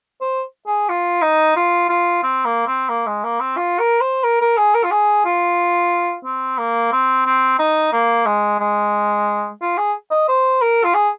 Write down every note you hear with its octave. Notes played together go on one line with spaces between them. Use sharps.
C5
G#4
F4
D#4
F4
F4
C4
A#3
C4
A#3
G#3
A#3
C4
F4
A#4
C5
A#4
A#4
G#4
A#4
F4
G#4
F4
C4
A#3
C4
C4
D#4
A#3
G#3
G#3
F4
G#4
D#5
C5
A#4
F4
G#4